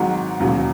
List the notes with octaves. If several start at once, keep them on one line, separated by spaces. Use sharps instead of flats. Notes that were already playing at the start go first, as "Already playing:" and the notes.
Already playing: G#1 G#2 D#3 F#3
E1 D#2 C#3 F#3